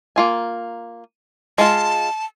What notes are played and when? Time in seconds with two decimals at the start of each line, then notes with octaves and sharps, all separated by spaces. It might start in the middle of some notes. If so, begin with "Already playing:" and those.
0.16 A#3 F4 G#5
1.58 G#3 F4 A5